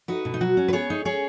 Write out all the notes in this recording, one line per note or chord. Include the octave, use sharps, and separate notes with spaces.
D#4 F#4 B4
B2
D#4
F#3 F#4
C#4
B4
B3 G#4 C#5
D#4
C#4 G#4 C#5